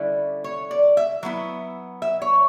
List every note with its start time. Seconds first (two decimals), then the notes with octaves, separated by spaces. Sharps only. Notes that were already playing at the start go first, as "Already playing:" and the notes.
Already playing: D3 G3 C#4 E4
0.44 C#5
0.71 D5
0.97 E5
1.23 F#3 B3 E4 E5
2.02 E5
2.22 C#5